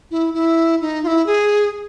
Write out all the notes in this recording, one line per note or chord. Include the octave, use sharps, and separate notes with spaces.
E4
E4
D#4
F4
E4
G#4